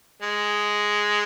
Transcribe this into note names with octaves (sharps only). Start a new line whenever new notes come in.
G#3